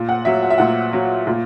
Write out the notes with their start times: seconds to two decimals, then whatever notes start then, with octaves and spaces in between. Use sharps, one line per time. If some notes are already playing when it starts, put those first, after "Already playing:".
Already playing: A#2
0.09 F#5
0.25 F#3 E5
0.43 F#5
0.50 E5
0.58 A#2 F#5
0.93 F#3
1.27 A#2